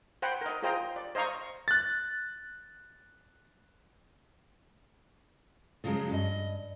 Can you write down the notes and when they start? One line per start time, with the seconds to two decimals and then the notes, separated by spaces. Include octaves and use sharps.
0.22 C5 F#5 G5 B5
0.41 A#4 D#5
0.62 F4 G#4 C5 D#5 G5 A#5
0.96 D5
1.15 C5 D#5 F5 A#5 C#6
1.68 F#6 A6
5.84 C#3 F3 F#3 G#3 C#4
6.10 G2 D#5